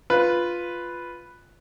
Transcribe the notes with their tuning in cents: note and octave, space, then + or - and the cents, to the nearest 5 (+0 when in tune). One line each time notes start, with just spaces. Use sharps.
F4 +0 B4 +0